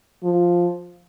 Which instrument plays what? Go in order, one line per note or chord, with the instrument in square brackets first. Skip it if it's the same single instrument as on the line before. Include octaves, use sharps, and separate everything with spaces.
[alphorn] F3